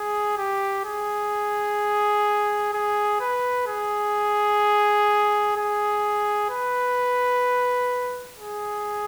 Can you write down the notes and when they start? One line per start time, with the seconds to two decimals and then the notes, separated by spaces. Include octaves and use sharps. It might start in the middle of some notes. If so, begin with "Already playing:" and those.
Already playing: G#4
0.38 G4
0.85 G#4
2.73 G#4
3.20 B4
3.67 G#4
5.56 G#4
6.50 B4
8.38 G#4